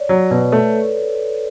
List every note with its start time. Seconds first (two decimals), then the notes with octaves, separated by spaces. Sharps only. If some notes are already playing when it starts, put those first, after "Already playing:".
Already playing: C#5 D5
0.09 F#3
0.31 B2 B4
0.52 A3
0.59 A4